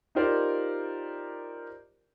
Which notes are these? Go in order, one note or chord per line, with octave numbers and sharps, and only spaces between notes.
D#4 F4 G4 A#4 C5 D5